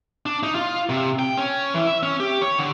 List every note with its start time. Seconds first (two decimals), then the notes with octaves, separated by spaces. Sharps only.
0.26 D4
0.43 D#4
0.55 F4
0.89 C3
1.19 G5
1.38 C#4
1.74 E3
1.87 E5
2.03 C#4
2.20 G4
2.41 C#5
2.59 D3